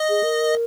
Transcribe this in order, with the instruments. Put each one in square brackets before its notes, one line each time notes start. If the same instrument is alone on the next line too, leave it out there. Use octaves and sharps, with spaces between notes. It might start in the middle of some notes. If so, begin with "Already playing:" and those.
Already playing: [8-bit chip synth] D#5
[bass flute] G#4
A#4